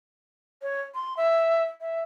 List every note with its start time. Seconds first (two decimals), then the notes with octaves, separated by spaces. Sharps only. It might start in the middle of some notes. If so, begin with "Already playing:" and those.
0.62 C#5
0.94 C6
1.17 E5
1.81 E5